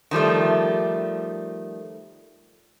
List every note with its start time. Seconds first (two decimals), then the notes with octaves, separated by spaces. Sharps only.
0.11 D#3 F3 G3 A3